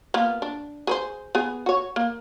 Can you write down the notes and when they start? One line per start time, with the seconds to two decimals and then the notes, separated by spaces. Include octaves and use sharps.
0.14 A#3 B3 F4
0.42 D4
0.87 G#4 B4 C5
1.35 B3 G#4
1.66 F#4 C#5
1.96 A#3